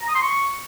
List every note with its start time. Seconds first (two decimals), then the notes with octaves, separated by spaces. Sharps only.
0.01 A#5
0.08 D#6
0.15 C6
0.22 C#6